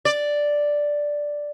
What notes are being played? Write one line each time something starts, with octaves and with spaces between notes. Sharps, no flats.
D5